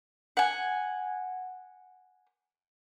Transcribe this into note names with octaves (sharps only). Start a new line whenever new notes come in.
F#5 G#5